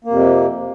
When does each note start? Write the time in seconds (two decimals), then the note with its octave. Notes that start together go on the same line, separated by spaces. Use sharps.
0.04 A#3
0.07 F2
0.11 C3